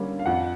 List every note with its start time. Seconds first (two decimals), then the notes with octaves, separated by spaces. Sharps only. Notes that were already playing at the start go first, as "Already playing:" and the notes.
Already playing: D3 G3 A#3 C#4
0.19 F5
0.26 F2 F#5